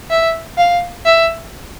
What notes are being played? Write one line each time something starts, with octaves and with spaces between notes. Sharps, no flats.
E5
F5
E5